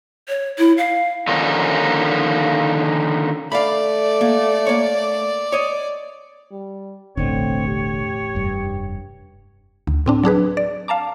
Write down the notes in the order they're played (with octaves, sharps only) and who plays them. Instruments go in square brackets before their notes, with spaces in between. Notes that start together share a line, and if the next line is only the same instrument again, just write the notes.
[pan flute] C#5
E4
F5
[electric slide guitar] D3 D#3 F3 A#3 C#4 D#4
[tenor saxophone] A3 [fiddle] D5 [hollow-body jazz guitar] F5 B5
[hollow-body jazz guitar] A#3
A#3 C#5
C#5 D#5
[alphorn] G3
[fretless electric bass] E1 D3 [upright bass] A1 A3 [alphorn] C4 [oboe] C#5
[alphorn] G4
[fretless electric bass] F1 G2
[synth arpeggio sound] D2
A2 C4 D4
F#3 D4 G#4 B4
D5
F5 A5 A#5 D6